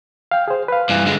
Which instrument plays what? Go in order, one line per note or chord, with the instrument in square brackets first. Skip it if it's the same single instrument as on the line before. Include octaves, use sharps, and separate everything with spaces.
[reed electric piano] F5 G5
G#4 C5
B4 F5
[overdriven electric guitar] G2 E3
D3 G#3